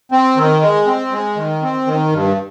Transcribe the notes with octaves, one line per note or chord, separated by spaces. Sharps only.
C4
D#3
G#3
C4
G#3
D#3
C4
D#3
G2